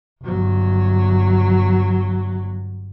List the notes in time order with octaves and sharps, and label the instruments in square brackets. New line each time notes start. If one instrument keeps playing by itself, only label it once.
[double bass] G1 F#3